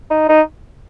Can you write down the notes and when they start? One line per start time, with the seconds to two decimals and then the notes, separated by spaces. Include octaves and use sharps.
0.11 D#4
0.29 D#4